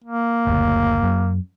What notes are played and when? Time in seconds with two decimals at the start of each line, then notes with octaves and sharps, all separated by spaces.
0.04 A#3
0.47 F#1 D2
1.03 F#2